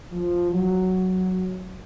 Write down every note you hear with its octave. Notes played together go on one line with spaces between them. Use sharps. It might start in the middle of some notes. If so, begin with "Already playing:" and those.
F3
F#3